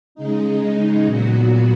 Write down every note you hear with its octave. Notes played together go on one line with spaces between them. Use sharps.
C#3 G#3 D#4
A#2 F#3 B3 F#4